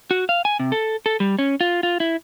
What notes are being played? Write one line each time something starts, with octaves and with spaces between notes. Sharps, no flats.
F#4
F5
G#5
C3
A4
A4
G3
C#4
F4
F4
E4